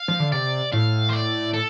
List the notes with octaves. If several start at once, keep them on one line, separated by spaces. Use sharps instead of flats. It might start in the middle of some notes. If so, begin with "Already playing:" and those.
Already playing: F5
F3
D3
C3 D5
A2 F5
C5
D5
A4